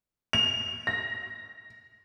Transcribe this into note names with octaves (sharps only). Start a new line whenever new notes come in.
F7
A#6